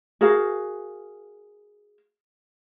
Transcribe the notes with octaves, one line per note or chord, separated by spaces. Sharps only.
F#4 G#4 A#4 F5